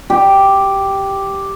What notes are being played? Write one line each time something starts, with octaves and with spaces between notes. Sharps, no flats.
G4